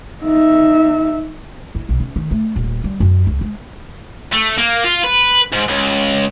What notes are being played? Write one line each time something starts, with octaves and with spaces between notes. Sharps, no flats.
D#4 E5
E4
B1
C#4
D#3
A3
D#1
G3
F#2
C#2
G#3
A3
A#3
F4
B4
G#2
C#2